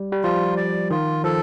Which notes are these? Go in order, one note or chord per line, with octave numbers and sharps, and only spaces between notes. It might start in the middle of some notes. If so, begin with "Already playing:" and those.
Already playing: G3
G3
F3 F4
D5
D#3 F4
F3 A4